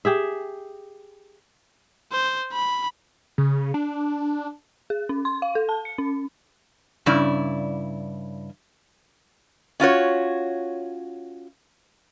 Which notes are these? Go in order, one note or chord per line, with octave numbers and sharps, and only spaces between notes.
G4 G#4 E5
C5
B5
C#3
D4
G#4
C#4
C6
F5
A4
A5
C#7
C#4
G2 C#3 E4 D5
C#4 F4 F#4 C#5